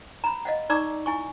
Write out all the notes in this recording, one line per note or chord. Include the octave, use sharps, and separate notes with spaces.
A#5 B5
D#5 F5 F#5
D#4 D5 A#5 C#6 D6 E6
E4 G#5 C#6